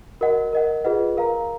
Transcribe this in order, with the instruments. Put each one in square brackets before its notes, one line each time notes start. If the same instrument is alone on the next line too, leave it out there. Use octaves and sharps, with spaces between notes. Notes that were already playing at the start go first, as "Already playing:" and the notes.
[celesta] F#4 A#4 D#5 F#5
A#4 D#5 F#5
F4 G#4 B4 D#5 F#5
A#4 F5 A#5